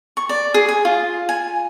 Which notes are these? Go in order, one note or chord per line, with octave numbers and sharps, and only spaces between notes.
C#6
D5
G#4
G#5
F4
G#5